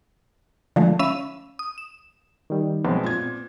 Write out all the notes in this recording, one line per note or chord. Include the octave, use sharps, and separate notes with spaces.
D3 F3 G#3 A3
C#4 E5 F5 B5 E6 D#7
D#6
E7
D#3 G3
B1 G#3 B3 C4
A#2 G#6